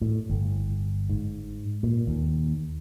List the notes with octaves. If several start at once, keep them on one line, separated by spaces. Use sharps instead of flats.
A2
G1
G#2
A#2
D#2